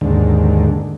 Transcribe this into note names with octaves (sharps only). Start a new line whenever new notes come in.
D#2 G#2 D3